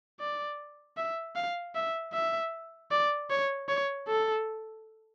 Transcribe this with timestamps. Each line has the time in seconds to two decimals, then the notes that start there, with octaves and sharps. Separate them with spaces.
0.20 D5
0.97 E5
1.36 F5
1.75 E5
2.13 E5
2.91 D5
3.30 C#5
3.69 C#5
4.08 A4